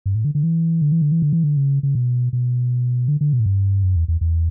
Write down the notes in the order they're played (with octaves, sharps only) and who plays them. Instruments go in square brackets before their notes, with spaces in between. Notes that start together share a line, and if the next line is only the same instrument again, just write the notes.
[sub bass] G2
A2
D3
D3
E3
D3
E3
D3
E3
D3
E3
D3
C#3
C#3
B2
B2
D3
D3
B2
A2
G2
F#2
E2
E2
E2